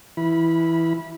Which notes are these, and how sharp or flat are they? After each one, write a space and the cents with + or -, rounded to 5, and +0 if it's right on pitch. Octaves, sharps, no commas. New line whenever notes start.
E3 +0 E4 +0 B5 -20